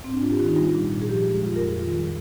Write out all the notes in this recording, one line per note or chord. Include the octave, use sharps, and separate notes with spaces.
G#2 C4
D4
G#2 F4
G4
D#3 F4
D#4
G3 F4
A#2
A#2
G#4
F3 G4
G#3
F2 F4
A#4
F2
G#4
D#3 F4
G3